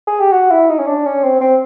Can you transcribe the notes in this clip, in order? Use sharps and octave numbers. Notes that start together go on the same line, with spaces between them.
G#4
G4
F#4
E4
D#4
C#4
D4
C#4
C4
C4